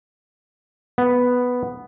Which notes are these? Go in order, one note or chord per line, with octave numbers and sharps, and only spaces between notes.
B3